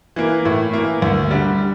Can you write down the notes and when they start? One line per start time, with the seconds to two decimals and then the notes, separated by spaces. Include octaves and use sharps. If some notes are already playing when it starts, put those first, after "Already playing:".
0.16 E3 A#3
0.45 A2
0.73 E3 A#3
1.02 D2
1.31 D3 G3